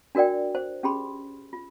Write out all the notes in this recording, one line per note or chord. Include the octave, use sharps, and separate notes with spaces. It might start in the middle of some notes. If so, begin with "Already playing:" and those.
D4 F#4 A#4 D5 G5
C5
C#4 G4 G#4 B5 C6
F4